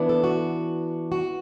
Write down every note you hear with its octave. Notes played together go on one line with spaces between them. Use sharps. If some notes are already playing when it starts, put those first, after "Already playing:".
Already playing: E3 B3 D4
A4
F#4
F#4